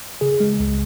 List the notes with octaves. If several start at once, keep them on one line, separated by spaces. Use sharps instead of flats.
C#3 G#4
G#3
C#2